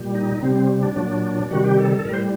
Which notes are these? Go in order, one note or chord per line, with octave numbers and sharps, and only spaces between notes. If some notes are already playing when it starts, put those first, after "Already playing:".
Already playing: A#2 G3
D#4
C3 G3 C4
C4
D4
A#2 F#3 D4
C3 D#3 G3 F#4
G4
A4
A4
A2 G3 A#4
C5